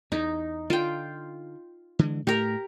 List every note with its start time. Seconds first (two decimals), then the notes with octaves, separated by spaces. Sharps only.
0.12 E2 D#4
0.70 D3 F4 G5
1.99 D3 E3 G#3
2.27 A2 A3 G4 A#4